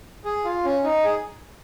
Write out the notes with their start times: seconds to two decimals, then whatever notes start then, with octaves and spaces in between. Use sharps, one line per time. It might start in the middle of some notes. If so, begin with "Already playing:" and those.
0.25 G#4
0.45 F4
0.65 C#4
0.84 D#4
1.04 G#4